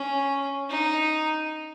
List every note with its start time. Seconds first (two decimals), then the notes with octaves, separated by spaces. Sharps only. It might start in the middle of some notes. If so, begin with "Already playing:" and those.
Already playing: C#4
0.70 D#4